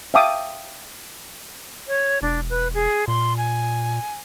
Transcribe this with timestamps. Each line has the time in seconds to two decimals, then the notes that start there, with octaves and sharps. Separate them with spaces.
0.14 E5 F5 G5 A5 D6 D#6
1.88 C#5
2.22 E1 D4
2.50 B4
2.74 G#4
3.08 A#2 C6
3.37 G#5